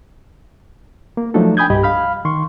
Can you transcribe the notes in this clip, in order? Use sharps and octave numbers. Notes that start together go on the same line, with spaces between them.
A#3
F3 F#3 A3 D4 D#4 A4
G5 G#5 B5 D#6 G6 G#6
C2 G2 G4 D#5 B5
F5 B5 F6
D#3 C6 C#6